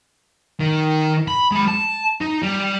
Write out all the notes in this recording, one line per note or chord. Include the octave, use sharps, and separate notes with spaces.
D#3
B5
G#3 B5
A5
D#4
G3